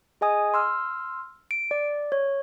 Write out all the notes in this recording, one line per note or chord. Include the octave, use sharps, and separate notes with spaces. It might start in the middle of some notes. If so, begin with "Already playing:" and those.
G#4 D#5 G#5 D#6
C6 E6 F6
D7
D5
C#5